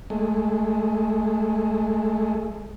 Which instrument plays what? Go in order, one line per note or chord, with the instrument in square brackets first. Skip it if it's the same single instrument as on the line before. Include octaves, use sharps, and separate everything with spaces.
[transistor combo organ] G#3 A3